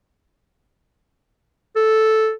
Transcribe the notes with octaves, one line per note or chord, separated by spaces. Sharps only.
A4